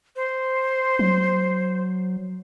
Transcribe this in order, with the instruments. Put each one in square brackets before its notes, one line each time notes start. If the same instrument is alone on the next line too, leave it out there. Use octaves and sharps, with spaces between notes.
[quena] C5
[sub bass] F#3